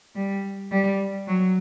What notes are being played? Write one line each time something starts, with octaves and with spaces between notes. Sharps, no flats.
G3
G3
F#3